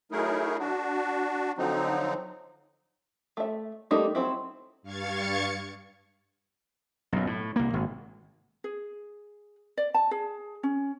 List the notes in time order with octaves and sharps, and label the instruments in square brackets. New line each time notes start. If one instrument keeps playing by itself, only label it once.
[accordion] F#3 A3 D#4 E4 G#4 A#4
D4 F#4
D3 F3 F#3 C4 D#4
[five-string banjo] A3 E5
G3 A3 A#3 D#4
F#3 C4 E4
[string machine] G2 F5 C#6 G#6 A6 C#7
[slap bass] B1 F#2
A2
C2 A#3
G#1
[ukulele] G#4
D5
A5
G#4
C#4